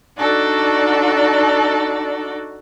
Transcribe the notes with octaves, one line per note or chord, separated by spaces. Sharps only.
D4 D#4 F#4 A4 D5